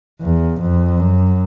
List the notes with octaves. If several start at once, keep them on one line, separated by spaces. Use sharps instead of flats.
E2
F2
F#2